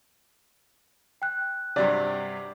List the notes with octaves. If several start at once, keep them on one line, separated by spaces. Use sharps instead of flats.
G5 F#6
G2 C3 F#3 D5